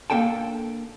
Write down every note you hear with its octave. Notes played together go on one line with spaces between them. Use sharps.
A#3 D4 A4 G5 A5